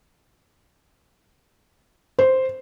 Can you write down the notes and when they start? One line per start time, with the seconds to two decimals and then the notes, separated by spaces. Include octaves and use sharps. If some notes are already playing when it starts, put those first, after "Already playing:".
2.19 C5